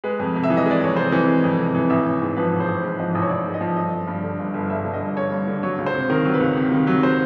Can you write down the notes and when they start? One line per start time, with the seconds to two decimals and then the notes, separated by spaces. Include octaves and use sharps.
0.04 G#3 B4
0.20 F2
0.35 C3
0.44 E5
0.50 E3
0.57 D#5
0.66 G#3 D5
0.81 F2 C#5
0.96 C3 C5
1.12 E3
1.28 G#3
1.44 F2
1.59 C3
1.75 E3
1.90 A1 E5
2.06 A1
2.22 G#2
2.36 F3 B4
2.53 A1
2.60 C5
2.68 A1
2.83 G#2
2.99 F3 D#5
3.15 A1
3.22 C#5
3.30 A1 D5
3.46 G#2
3.54 D#5
3.61 F3
3.76 G1 D#5
3.93 G1
4.07 G2
4.23 D3
4.39 G1
4.54 G1
4.70 G2 E5
4.85 D3
4.94 D#5
5.01 G1
5.16 G1 C#5
5.32 G2
5.47 D3
5.63 F#3 C#5
5.78 C#2
5.86 C5
5.94 C3
6.10 D#3 A#4
6.25 F#3
6.34 B4
6.40 C#2
6.56 C3
6.72 D#3
6.87 F#3
7.03 C5